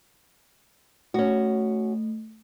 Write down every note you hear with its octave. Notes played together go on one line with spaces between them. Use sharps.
A3 C#4 F#4